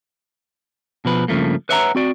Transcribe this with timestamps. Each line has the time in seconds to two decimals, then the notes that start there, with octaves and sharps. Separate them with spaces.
1.05 B2 F3 B4
1.28 G2 C#3 F3 A3 A#3
1.69 B4 C#5 E5 F#5 G#5 A#5
1.95 C4 F#4 D5